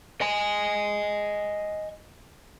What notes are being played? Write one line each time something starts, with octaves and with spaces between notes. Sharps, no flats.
D#5 G#5